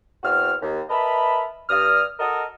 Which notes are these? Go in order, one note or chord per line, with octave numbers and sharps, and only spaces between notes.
E2 C4 F#4 F6
D#2
A#4 B4 D#5 E5 A5 B5
G2 D#6 F6
F#4 A4 A#4 D#5